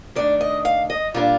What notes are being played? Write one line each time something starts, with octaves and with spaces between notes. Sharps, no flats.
D#3 A3 D4 D5
D#5
F5
D#5
A#2 G3 D4 F4